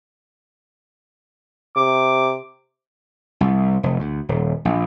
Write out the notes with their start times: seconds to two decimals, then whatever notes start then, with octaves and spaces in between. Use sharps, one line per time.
1.76 C3 D6
3.41 C2
3.83 F1
3.99 D2
4.29 D#1
4.65 A#1